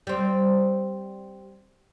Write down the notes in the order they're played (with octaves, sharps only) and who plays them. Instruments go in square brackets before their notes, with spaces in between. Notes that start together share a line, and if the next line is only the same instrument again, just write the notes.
[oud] G3 C4